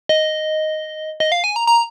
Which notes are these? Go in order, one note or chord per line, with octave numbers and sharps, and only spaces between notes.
D#5
D#5
F5
G#5
A#5
A#5